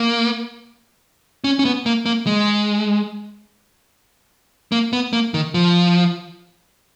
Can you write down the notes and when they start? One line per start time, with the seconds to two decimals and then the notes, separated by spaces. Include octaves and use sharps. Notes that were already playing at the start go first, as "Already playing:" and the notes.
Already playing: A#3
1.44 C#4
1.59 C#4
1.65 B3
1.86 A#3
2.06 A#3
2.27 G#3
4.72 A#3
4.93 B3
5.13 A#3
5.34 D#3
5.54 F3